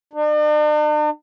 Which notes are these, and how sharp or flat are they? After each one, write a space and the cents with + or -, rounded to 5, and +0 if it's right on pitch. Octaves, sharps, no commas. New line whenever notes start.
D4 +45